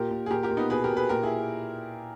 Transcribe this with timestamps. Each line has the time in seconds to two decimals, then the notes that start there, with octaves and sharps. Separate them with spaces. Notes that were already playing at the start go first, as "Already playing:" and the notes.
Already playing: A#2 G4 A#4
0.11 A#2
0.26 G#4
0.30 A#2 G4 A#4
0.43 G4 A#4
0.51 A#2
0.57 B3 D#4
0.70 B2 G#4 B4
0.84 G4 A#4
0.90 B2
0.96 G#4 B4
1.09 A#2 G4 A#4
1.23 E4 G#4